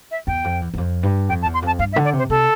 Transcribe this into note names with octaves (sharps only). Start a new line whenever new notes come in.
E5
E2 G5
F2
E2
E2
F2
G2
F2 G5
A5
E2
C6
F2 A5
G2 F5
E5
D3
D5
C3
C5
C3 A4